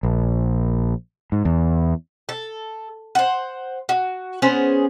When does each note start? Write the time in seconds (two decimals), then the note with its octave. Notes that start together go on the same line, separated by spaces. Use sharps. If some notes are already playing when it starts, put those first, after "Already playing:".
0.03 A#1
1.32 G#2
1.45 E2
2.29 A4
3.15 C5 F#5
3.89 F#4
4.42 B3 C#4 G#4 C5